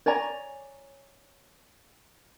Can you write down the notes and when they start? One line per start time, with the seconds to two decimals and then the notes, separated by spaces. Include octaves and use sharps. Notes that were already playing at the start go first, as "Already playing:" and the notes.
0.06 C#5 D5 G#5 A#5